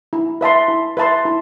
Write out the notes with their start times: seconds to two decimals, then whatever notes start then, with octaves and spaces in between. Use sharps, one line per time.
0.13 E4
0.41 B4 E5 A5 C6
0.68 E4
0.97 B4 E5 A5 C6
1.25 E4